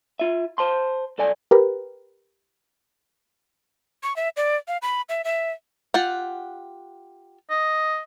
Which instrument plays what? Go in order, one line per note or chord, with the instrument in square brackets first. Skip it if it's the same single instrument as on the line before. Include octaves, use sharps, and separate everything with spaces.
[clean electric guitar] F4 E5
C5 A5 C6
B1 A4 D5 G#5
[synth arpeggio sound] G4 A#4 B4
[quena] C#6
E5
D5
F5
B5
E5
E5
[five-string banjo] F4 G4 F#5
[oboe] D#5